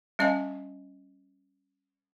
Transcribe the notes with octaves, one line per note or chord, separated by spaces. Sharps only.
G3 C#4 D#5 F5 G#5